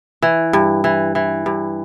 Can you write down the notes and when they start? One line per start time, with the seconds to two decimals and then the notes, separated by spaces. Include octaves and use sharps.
0.22 E3
0.53 G2
0.84 E3
1.15 E3
1.46 G2